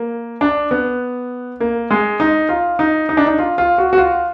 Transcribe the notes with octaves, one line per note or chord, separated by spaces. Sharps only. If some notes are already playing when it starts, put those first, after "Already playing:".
Already playing: A#3
D4
B3
A#3
G#3
D#4
F4
D#4
D#4
D4
D#4
F4
F4
F#4
F#4
F4